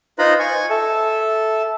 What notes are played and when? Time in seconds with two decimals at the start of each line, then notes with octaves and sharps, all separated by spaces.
0.19 D#4 F4 B4 C5 A#5 B5
0.39 G#5 C#6
0.70 A4 E5